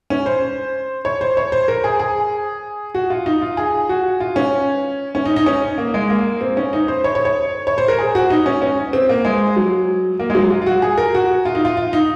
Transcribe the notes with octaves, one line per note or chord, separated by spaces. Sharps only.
C#4
C5
C#5
C5
C#5
C5
A#4
G#4
G#4
F#4
F4
D#4
F4
G#4
F#4
F4
C#4
C#4
D#4
D#4
C#4
A#3
G#3
A#3
C4
C#4
D#4
C5
C#5
C#5
C#5
C#5
C5
A#4
G#4
F#4
D#4
C#4
C#4
C4
A#3
G#3
F#3
A#3
G#3
F#3
F4
F4
F#4
G#4
A#4
F#4
F4
D#4
F4
F4
D#4